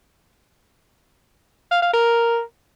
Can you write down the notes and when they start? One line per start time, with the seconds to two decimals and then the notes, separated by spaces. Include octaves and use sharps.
1.71 F5
1.82 F5
1.94 A#4